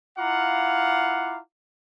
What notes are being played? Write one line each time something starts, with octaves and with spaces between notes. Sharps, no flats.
E4 F4 F5 F#5 A#5 D6